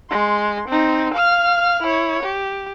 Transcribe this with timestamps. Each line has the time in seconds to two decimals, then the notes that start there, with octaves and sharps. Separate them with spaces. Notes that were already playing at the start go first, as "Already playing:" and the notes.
0.10 G#3 C6
0.69 C4 D#4
1.14 F5 F6
1.83 E4 C#5
2.23 G4